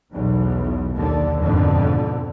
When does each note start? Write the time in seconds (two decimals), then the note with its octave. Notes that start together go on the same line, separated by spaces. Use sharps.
0.13 B1 E2
0.92 D#2 D3
1.39 F2 G#2 B2 D3